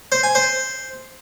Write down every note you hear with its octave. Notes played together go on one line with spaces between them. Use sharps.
C5
G#5
C5